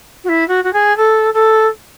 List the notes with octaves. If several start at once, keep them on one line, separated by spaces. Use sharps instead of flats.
F#4
E4
F#4
F#4
G#4
A4
A4